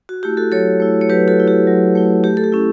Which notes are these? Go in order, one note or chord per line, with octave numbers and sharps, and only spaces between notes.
F#4
A3 E4 G4
F#4 A4
F#3 A4 C#5
A3 E4
C#5
F#3 G4 B4
F#4 A4
A3 E4
G4
F#3
A3 E4
A3 G4
A4
G4
C#4 E4